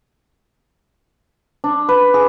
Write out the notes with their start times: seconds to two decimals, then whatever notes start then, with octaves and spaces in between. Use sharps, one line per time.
1.64 D4
1.89 B4
2.14 G#4